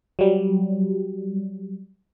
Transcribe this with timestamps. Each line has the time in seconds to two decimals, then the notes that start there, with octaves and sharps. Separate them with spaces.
0.19 F#3 G3